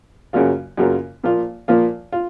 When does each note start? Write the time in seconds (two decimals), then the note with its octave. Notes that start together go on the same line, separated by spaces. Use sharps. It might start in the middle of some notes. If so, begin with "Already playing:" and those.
0.33 F#2 C#3 F#3 A#3 F4
0.77 F#2 C#3 F#3 A#3 F4
1.24 A#2 F3 A#3 F4
1.68 A#2 F3 A#3 F4
2.12 F4